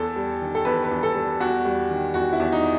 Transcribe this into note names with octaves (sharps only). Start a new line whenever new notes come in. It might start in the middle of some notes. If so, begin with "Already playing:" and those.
Already playing: E2 A4
G3
D#3
A4
E2 B4
B4
E2
A4
G3
E2 F#4
G3
D#3
E2 F#4
E4
E2
D#4